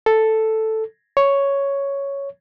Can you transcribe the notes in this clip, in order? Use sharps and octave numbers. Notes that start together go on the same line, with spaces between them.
A4
C#5